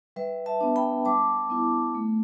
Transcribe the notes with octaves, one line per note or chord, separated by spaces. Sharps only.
G3 B4 E5
E5 A5
B3 D4
G5 B5
G3 A5 D6
B3 E4
A3